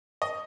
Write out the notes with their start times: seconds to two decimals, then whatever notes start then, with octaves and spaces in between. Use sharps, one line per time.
0.22 D#5